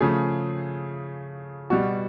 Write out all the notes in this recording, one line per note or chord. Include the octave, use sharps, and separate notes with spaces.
C#3 F3 A3 G#4
B2 G3 F#4